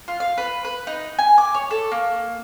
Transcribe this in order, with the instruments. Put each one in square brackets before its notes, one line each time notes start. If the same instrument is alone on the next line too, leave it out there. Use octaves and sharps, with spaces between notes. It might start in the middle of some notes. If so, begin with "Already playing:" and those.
[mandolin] F4
F5
B4
B4
D#4
G#5
D6
C#5
A4
A#3